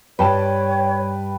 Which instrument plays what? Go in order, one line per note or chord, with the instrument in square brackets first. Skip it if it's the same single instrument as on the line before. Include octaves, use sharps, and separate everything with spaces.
[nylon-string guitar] G2 [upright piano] B4 G5 A5 [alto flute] C#5